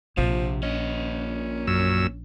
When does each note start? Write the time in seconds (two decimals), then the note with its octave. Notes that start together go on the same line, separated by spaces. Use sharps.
0.17 A#1 C3 F3
0.63 A#2 C#4 D#5
1.67 F#2 E6